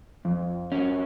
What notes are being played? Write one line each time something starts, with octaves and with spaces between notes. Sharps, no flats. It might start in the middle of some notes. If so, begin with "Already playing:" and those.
F2
C#4